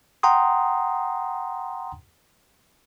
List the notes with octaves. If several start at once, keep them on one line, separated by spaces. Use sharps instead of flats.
F#5 G5 A#5 C6 D#6